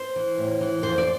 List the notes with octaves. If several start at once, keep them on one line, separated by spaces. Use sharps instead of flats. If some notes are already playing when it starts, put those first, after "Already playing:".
Already playing: C5
E3
A2
E3
F2 C5
D5